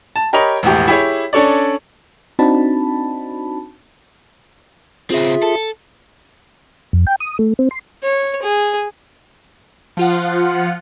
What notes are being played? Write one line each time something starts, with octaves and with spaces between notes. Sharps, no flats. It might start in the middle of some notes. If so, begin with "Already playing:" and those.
A5
G4 A#4 C#5 D#5 B5 F7
E1 A#1 A2 G4
E4 G4 G#4 C#5
C#4 D4 A4 C#5 D5
C4 D4 D#4 F#4 A5 B5
C#3 C4 F4 G#4 E5
A4
F2
G5
D#6
A3
C4
C6
C#5
G#4
F3 F4 F#5